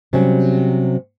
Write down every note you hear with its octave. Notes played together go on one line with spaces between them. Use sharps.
C3 F#3 G3 C4 C#4